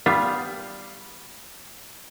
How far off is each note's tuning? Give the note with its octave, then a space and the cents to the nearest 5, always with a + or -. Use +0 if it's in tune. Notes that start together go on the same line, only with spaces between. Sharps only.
G3 +0 B3 +15 F4 +0